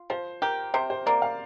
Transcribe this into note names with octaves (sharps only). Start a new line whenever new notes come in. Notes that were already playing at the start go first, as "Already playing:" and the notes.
Already playing: F4
F3 C5
G4 A#4
C3 C5
C5
A#3 D5
F5